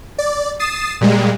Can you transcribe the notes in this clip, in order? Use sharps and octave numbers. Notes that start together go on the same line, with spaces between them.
D5
D#6 A6 C7 E7
A#2 G3 G#3